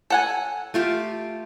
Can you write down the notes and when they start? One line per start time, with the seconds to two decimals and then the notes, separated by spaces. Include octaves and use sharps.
0.10 A4 F#5 G#5
0.74 A3 F4 G4